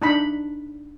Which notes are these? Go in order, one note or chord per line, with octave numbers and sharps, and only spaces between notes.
D4 D#4 B5